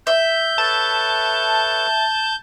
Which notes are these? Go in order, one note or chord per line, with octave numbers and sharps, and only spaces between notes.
E5 G6
A4 B4 C#5 A5